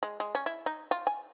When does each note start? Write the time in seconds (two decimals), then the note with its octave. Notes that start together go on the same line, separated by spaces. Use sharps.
0.03 G#3
0.20 G#3
0.35 C#4
0.46 E4
0.66 D#4
0.91 F4
1.07 G#5